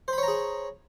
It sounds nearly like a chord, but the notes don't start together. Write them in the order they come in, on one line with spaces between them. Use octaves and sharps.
C5 B5 C#5 A#5 G#4